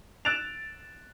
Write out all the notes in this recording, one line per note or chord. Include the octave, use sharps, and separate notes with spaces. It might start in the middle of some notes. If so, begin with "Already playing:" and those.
E6 F#6 A6 D7 E7 F7